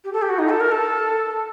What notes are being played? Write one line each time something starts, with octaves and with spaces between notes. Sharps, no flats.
G4
A4
G4
F#4
D#4
A4
A#4
A4